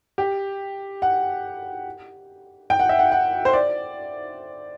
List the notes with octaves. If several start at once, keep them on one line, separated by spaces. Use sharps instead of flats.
G4
F#5
G5
F#5
E5
F#5
F#5
C5
D5